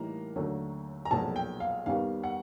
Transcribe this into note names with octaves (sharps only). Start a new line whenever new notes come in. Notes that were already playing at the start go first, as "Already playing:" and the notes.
Already playing: A2 E3 G3 A#3 D#4 A#5
D#2 D3 F#3 A3
A#5
B1 A#2 F3 G#3 A5
G5
F5
D#2 D#3 G3 B3 F5
F#5